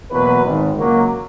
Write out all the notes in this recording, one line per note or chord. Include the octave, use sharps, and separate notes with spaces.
E2 B2 F#3 A#3 B4
G#1 G#2 D#3
C#2 C#3 F#3 A#3